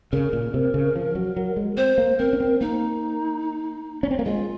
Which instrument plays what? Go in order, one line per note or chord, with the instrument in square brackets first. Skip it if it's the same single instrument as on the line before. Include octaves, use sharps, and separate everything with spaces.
[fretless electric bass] C#3 [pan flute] A#4
[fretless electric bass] A#2
C3
C#3
F3
F#3
F#3
G#3
[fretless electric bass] C4 [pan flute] C5
[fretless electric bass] A#3
[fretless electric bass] C4 [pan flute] A#4
[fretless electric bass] C#4
C4
[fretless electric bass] A#3 [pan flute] D#4
[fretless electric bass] C#4
C4
A#3
[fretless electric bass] G#3 [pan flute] F4